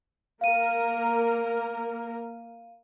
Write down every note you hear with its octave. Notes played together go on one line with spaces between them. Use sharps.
A#3 A#4 F5 D#7